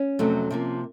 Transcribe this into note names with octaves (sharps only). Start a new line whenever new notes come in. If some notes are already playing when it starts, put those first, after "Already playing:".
Already playing: C#4
F2 C3 F#3 A3
C3 F3 A#3